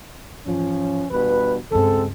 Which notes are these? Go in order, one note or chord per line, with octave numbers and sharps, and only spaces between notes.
G#2 E3 F3 C#4
E2 G2 B2 B4
C#2 G2 G#3 C4 A4